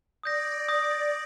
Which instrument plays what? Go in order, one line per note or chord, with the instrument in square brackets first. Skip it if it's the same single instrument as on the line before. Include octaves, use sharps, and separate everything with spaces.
[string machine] D5 [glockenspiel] D#6 G6 A#6
[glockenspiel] D#6 G6 A#6